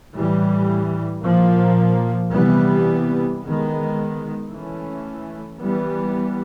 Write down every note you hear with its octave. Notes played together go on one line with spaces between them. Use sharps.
A2 E3 G3
A#2 F3 A#3
C3 E3 G3 B3
D#3 G#3 B3
E3 A3 C#4
E3 G3 B3